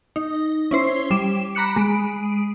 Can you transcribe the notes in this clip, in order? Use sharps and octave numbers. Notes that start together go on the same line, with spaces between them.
D#4
C#4 E4 C5 C7
G3 D6 E7
A#5 B5 D6 F#6 C#7
G#3 B5 D7